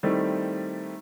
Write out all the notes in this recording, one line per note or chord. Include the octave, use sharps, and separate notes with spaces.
D#3 G3 A3 C4 E4